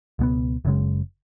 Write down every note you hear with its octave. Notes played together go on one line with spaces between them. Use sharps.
C#2 B2 G#3 B3
F#1 F#2 C#3 G#3